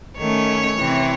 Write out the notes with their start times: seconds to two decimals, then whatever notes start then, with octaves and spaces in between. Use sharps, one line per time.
0.18 D#3 A3 C#4 C#5
0.78 C3 E3 C4